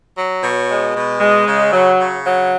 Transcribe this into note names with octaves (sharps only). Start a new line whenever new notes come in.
F#3
B2 C#5
G#3
B2
G#3
C#3
F#3
C#3
F#3